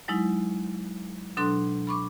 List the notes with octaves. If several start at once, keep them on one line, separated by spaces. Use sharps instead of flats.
F#3 G#3 D#4 E4
B2 F#3 D4 A4 C6 F#6
B5 C#6 D6